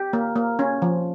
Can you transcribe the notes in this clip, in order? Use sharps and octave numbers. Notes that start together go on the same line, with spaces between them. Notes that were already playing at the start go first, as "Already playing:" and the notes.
Already playing: G4
A#3
A#3
C#4
F3